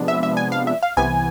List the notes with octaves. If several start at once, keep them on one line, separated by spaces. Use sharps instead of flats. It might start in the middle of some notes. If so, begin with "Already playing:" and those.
Already playing: C3 F3 G#3 B3 D4
E5
E5
G#5
F5
E5
F5
C2 C3 E3 B3 G#5